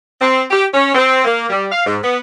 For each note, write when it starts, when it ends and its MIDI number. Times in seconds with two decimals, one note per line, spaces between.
0.20 0.42 60
0.50 0.65 67
0.73 0.94 61
0.95 1.25 60
1.25 1.48 58
1.50 1.66 55
1.72 1.83 77
1.86 1.97 44
2.02 2.18 59